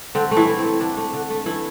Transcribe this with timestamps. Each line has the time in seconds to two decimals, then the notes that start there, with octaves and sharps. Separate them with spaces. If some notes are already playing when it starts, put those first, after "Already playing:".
0.15 D3 C4
0.31 A3
0.36 E3 E4
0.48 A3
0.59 C4
0.64 A3
0.80 D3 D4
0.97 A3
1.13 D3
1.30 A3
1.46 E3 A3 E4